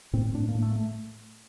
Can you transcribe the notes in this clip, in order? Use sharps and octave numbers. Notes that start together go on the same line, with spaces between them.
A2 C4
A2 D4
A#3
A2
A3
A3